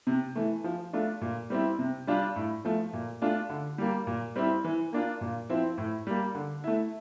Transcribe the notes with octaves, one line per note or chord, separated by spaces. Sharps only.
C3
E3 A3
F3
A3 D4 F4
A#2
G3 C4 E4
C3
G3 D4 F4
A2
F3 A3
A#2
A3 D4 F4
D3
G3 A#3
A#2
G3 C4 E4
E3
A#3 D4 F4
A#2
F3 C4 E4
A2
G3 A#3
D3
A3 E4